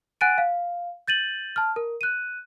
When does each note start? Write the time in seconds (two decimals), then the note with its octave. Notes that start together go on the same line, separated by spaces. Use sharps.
0.21 F#5 G#5 F#6 A6 D7 D#7
0.38 F5
1.08 G6 A6 D#7 F#7
1.56 A5 F6
1.76 A#4
2.01 F#6 D#7